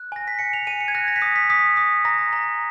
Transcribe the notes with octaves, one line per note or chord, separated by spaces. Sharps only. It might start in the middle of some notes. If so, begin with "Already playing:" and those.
Already playing: F#6
G#5 A#6
B6
G#5 C#7
F7
G#5 D#7
C#7
G#6
F#6 A#6
A#6
B6
D#6 A#6
B6
D#6 B6
D#6
A#5 A#6
A#5